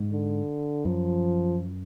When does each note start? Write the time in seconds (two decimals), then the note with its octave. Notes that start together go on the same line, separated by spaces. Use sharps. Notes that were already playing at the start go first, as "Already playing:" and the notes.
Already playing: G#2
0.12 D3
0.85 F#2 F3